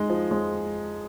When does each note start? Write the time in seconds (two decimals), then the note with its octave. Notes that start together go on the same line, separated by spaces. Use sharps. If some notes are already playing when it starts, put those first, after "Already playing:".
Already playing: G#3 D#4
0.09 F3
0.31 G#3